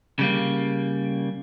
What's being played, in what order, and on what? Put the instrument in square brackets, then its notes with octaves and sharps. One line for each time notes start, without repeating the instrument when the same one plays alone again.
[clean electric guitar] C#3 G3 A#3